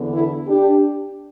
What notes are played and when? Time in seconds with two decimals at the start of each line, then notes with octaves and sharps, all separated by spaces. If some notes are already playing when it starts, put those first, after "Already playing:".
Already playing: E2 D3 B3
0.14 E4 A4
0.48 D4 G4